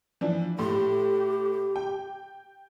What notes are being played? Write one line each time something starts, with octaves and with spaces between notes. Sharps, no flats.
E3 F3 D4
A2 G4 C6
G5